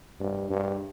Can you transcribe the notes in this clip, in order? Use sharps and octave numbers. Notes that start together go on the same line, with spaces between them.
G2
G2